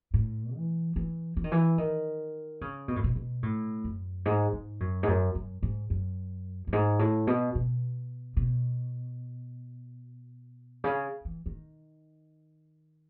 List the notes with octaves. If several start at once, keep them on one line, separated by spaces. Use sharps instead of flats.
A2
E3
E3
E3
D#3
E3
D#3
C#3
B2
A2
B2
B2
A2
F#2
G#2
G#2
F#2
G#2
F#2
F#2
G#2
F#2
F#2
G#2
A2
B2
B2
B2
C#3
E3
D#3